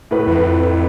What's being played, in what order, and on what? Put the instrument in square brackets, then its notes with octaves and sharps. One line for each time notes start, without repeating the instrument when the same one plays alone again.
[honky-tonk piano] A2 B4
[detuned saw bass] F2